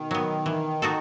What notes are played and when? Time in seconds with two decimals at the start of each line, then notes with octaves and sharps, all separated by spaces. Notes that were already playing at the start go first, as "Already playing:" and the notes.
Already playing: B2 D#3
0.11 F#3 B3
0.46 E3
0.82 D#4 F#4 A4